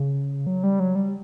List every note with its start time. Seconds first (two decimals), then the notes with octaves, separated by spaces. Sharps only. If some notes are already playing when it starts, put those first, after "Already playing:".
Already playing: C#3
0.47 F#3
0.63 G3
0.80 F#3
0.95 G3